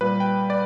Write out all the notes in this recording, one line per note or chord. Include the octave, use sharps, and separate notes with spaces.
A#2 G3 B4
G5
D5